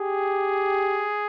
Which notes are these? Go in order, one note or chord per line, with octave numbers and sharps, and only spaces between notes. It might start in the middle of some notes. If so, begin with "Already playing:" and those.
Already playing: G4 G#4